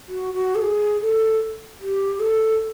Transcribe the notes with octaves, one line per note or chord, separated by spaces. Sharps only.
F#4
F#4
A4
G#4
A4
G4
A4